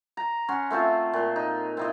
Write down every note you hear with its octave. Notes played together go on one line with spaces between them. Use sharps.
A#5
C#4 F#5 C6
A3 C4 F4 C5
A#2
D#4
C4 E4 D#5